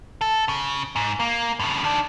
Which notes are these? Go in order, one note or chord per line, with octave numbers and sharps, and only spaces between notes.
A4
C#3
G#2
A#3
G2 C#3
D#3 D4